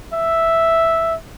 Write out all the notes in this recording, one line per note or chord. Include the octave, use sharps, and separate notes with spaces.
E5